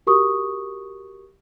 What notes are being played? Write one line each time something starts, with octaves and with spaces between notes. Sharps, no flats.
F#4 G4 A#4 C#6 D#6